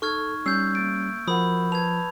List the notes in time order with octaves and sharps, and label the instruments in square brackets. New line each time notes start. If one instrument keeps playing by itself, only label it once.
[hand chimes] D#4 [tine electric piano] A4 [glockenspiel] C#6 F6 G#6
[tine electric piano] G3 C#4 C7 [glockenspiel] E6 G6
[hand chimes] A#3 A6 D7
[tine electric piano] F3 [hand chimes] F#4 A#4 F#5 [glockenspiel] B5 D#6
[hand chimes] B4 A5 [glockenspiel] G#6 F7